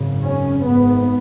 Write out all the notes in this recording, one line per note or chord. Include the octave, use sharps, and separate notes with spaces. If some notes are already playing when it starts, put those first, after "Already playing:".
Already playing: G#1 F#2 C#3
C#4
G#1 G#2 B3